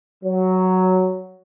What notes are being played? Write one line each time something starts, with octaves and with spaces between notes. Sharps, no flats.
F#3